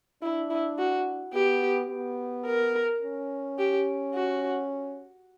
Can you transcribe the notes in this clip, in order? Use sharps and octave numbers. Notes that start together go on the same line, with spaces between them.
D4 E4
E4
F#4
B3 G4
B3
A#4
C#4
G4
F#4